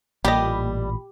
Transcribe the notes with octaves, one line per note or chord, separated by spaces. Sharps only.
A1 A#2 G3 G4 D#5 B5